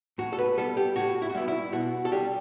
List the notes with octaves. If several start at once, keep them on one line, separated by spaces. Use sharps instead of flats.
A2 F#4
A4
B4
G3 B3 A4
G4
A2 F#4
E4
F#4
G3 B3 E4
E4
B2 F#4
A4
G3 D4 G4